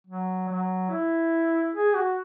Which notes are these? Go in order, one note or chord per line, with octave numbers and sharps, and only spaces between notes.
F#3
F#3
E4
G#4
F#4